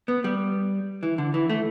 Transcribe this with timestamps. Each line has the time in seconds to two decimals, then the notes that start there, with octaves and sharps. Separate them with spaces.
0.08 B3
0.24 G3
1.03 E3
1.18 D3
1.34 E3
1.49 A3